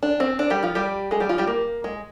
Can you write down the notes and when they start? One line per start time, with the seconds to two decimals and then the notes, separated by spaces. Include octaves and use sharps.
0.03 D4
0.20 C4
0.39 D4
0.50 G3 G4
0.63 F3 F4
0.75 G3 G4
1.11 G#3 G#4
1.20 G3 G4
1.29 F3 F4
1.38 G3 G4
1.47 A#3
1.84 G#3